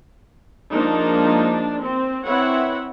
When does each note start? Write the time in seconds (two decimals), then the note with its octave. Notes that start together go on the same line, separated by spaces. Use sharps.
0.72 F3 G#3 A#3 D4 D#4
1.81 C4
2.24 C4 E4 B4 C#5 E5 F#5